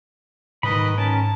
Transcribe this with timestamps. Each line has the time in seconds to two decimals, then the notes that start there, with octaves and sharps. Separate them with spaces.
0.63 G#2 D#3 G3 A3 B4 D#5 B5
0.98 C#4 A#4 A5